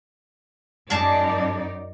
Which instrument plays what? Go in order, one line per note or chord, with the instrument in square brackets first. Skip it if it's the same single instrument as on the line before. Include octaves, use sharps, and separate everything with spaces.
[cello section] F#2 D#4 D5 [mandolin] G#4 A5